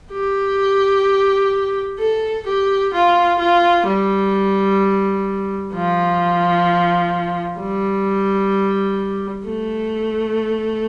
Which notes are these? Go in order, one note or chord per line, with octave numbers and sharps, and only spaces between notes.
G4
A4
G4
F4
F4
G3
F3
G3
A3